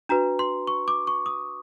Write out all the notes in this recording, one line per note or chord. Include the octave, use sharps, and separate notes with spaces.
D4 F#4 B4 A#5
C6
C#6
D6
C#6
D#6